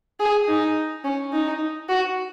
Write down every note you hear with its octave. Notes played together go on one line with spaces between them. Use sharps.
G#4
D#4
C#4
D#4
F#4